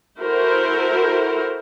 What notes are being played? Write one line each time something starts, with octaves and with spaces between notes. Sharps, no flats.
E4 F#4 A4 A#4 C5